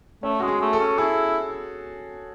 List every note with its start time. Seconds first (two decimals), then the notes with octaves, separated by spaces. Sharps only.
0.23 A3 C#4
0.40 G#3 F#4
0.48 G#4
0.61 A3
0.73 A4
0.80 C#4
0.98 E4 G#4